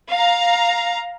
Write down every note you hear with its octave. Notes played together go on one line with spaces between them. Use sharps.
F5 A#5